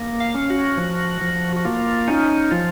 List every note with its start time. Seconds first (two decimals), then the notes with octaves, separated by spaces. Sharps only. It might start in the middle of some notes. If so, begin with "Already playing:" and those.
Already playing: A#3
0.20 F5
0.34 C#4
0.50 F#4
0.78 F3
1.22 F3
1.56 F#4
1.65 A#3 F4
2.08 C#4 D#4
2.51 F3 F4